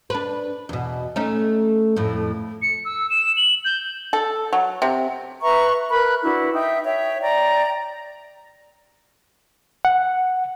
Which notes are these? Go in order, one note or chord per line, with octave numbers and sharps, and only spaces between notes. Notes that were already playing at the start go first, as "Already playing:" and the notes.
D4 B4
E2 B2
A3 C#4 D#4
F2 A2
C#7
E6
E7
F#7
G6
A4
F#3
C3
B4 E5 A#5 C#6
A#4 B4 B5 F#6
D4 E4 F#4 B4
D#4 E5 G5
C#5 E5 G5
D5 G5 A#5
F#5